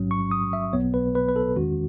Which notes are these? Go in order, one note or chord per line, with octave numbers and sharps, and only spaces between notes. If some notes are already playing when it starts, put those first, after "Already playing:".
Already playing: A1 G#2 F#3 C#4
C#6
D#6
E5
B1 B2 F#3 B3 C#5
B4
B4
B4
A4
E2 D#3 G#3 C#4 F#4